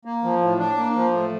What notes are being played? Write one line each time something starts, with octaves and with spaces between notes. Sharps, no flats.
A#3
F3
A2
D4
A#3
F3
A2